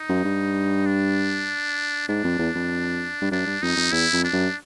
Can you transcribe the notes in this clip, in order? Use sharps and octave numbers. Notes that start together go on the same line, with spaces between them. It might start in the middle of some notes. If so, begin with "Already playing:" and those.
Already playing: D#4
F#2
G2
D4
G#2 D4
F2
E2
F2
G2
F#2 D4
G2
F2 D#4
F2
E2 E4
F2
D4
F#2